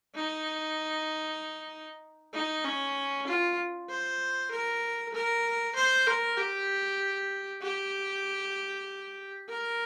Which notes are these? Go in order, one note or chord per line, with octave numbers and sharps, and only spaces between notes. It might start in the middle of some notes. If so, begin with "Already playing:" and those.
D#4
D#4
C#4
F4
C5
A#4
A#4
C5
A#4
G4
G4
A#4